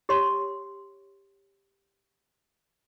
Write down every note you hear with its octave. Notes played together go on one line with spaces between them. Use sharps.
G4 C#5 C6